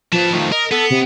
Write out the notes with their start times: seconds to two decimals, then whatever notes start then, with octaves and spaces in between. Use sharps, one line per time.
0.12 F3 B4 A5
0.33 D#3 F3 A3
0.52 A#4 D#5
0.71 B3 A4
0.90 C3